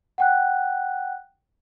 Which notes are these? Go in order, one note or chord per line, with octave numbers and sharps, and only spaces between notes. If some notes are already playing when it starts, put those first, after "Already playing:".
F#5 G5 F#6